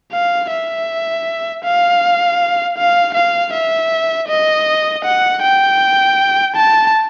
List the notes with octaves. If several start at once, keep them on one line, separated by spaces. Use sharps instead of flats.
F5
E5
F5
F5
F5
E5
D#5
F#5
G5
A5